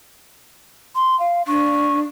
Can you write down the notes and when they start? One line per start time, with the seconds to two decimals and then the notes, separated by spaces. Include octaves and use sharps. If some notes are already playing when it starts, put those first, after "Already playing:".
0.96 C6
1.20 F5
1.48 D4 C#6